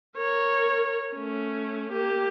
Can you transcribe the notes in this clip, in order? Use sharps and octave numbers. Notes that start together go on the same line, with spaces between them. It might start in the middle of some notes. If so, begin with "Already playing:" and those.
A#4 C#5
A3 C#4
A#3 G4